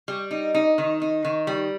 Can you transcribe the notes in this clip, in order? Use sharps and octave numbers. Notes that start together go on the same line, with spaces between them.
G3
D#4
D#4
D#3
D#4
D#3
G3